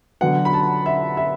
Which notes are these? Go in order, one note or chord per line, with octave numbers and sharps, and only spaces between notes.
D3 F#3 B3 F#5
B5
A5
E5
E5